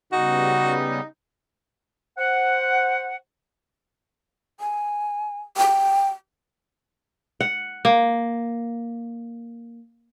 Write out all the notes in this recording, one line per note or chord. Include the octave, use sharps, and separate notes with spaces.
C#3 G3 B3 D#4 F#4
C5 F#5
G#5
G5
F#5
A#3